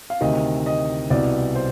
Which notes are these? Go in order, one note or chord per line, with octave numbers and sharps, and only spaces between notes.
F5
D2 C3 D#3 D#5
D#5
C2 B2 D5
C5